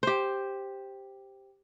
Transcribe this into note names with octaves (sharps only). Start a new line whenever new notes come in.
G4 C5